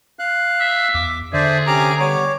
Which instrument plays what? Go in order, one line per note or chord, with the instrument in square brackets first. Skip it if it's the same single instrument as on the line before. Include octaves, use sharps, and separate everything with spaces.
[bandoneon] F5 F#6
[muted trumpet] E5
[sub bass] E2 [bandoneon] D6
[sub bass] D3 [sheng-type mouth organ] D4 [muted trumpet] G#4 [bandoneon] C5 D5 E5
[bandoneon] C3 C#4 G4 [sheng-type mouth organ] A#5 D6
[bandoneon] G3 B3 [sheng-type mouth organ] C#5 D6